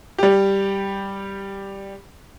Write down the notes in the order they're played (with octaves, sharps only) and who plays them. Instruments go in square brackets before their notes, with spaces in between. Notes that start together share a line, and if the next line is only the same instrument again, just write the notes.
[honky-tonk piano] G3 G4